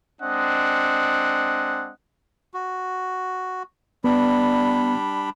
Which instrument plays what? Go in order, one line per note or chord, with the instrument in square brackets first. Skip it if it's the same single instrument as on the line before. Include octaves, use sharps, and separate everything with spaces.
[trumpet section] G#3 C4 D4 D#5 F#5
[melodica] F#4
[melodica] G3 D4 B5 [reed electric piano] B3